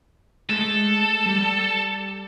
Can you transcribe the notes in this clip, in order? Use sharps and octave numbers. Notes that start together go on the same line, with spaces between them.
G#3 A3 A4
G3